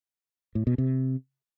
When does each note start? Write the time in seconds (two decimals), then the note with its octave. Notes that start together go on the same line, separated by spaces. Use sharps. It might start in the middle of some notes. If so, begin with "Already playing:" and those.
0.55 A2
0.67 B2
0.78 C3